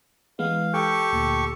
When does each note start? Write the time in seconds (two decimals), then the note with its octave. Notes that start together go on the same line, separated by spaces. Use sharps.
0.39 E3 G#3 B3 F5
0.74 G4 A4 G5 C#6
1.13 D2 A#2